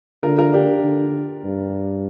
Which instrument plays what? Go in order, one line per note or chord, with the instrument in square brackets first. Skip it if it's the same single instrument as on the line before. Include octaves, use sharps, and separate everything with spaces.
[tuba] D3 [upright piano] F4 A#4
[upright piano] F4 A#4
D4 G4
[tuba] D3
G2